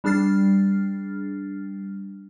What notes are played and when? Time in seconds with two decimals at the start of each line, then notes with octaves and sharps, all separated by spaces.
0.04 G3 D4 G#4 F6 A6 C7